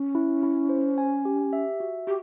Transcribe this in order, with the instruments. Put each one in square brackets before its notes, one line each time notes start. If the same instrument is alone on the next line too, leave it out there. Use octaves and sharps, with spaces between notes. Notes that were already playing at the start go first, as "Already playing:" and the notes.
Already playing: [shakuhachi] C#4
[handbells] E4
E4
C5
G#5
G4
E5
F#4
[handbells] F#4 [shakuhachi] G4